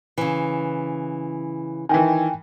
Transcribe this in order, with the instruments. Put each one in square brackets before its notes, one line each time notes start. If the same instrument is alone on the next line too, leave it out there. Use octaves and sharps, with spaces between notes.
[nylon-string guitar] C#3 E3
[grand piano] D#3 E3 [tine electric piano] G5 G#5